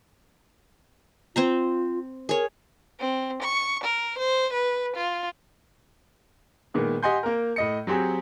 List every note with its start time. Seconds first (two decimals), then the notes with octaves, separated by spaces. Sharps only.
1.36 C4 F4 C5 A#5
2.29 G#4 A#4 C#5
3.00 C4
3.43 C#6
3.84 A#4
4.19 C5
4.53 B4
4.96 F4
6.74 A#2 D#3 G#3 B3
7.03 G4 D#5 F#5 G#5 C6 G6
7.23 A#3 A#4
7.56 A2 D#5 C#7
7.87 F#3 C4 G4 G#4